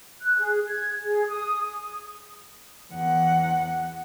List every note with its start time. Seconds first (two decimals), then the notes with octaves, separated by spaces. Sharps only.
0.20 F#6
0.37 G#4
0.67 G#6
1.03 G#4
1.28 D#6
2.92 E2 F#5